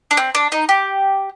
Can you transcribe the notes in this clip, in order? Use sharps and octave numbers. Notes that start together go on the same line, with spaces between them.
D4
C4
D4
D#4
G4